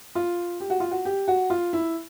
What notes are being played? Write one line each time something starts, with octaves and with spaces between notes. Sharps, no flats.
F4
G4
F#4
F4
F#4
G4
F#4
F4
E4